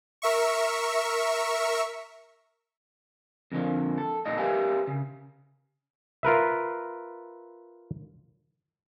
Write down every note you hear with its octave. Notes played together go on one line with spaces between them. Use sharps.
A#4 E5 C#6
F2 D3 F3 A#3
A4
A#2 D#4 A4 D#5
G4 A#4 B4 E5 F5 G#5
C#3
F4 A#4 B4 E5